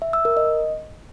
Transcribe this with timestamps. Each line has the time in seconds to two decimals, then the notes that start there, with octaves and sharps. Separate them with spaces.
0.02 E5
0.13 E6
0.25 A#4
0.37 D#5